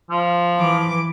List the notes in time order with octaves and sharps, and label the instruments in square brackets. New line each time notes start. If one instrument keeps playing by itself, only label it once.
[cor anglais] F3
[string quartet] E3 D6